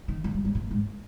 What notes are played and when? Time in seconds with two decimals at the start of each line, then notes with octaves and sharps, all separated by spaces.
0.08 D#3
0.24 F3
0.34 G3
0.45 G3
0.55 A#2
0.71 G#2